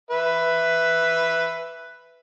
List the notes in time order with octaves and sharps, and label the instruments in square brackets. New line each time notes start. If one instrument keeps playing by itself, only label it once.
[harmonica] B4 E5